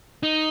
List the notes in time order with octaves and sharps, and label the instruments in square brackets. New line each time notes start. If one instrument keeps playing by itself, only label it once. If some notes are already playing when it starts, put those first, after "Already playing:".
[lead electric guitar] D#4